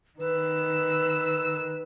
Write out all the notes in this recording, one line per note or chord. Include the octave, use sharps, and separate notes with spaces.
D#3 B4 E6